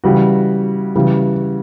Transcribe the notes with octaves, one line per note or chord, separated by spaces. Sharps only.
C#3 E3 G3 F#4
C#3 E3 G3